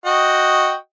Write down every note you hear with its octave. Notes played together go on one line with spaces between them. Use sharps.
F#4 D#5 G5